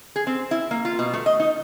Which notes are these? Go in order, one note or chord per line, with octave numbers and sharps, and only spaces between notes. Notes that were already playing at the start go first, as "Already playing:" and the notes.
G#4
C4
E4
A#3
F4
B2
A3
D#5
D#4